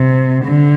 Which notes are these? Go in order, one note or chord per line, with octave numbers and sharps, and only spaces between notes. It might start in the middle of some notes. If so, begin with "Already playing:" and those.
Already playing: C3
D3